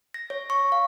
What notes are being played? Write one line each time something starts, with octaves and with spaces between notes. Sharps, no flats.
A#6
C#5
C#6
F5